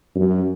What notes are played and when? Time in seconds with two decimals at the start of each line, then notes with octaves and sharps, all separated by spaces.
0.16 F#2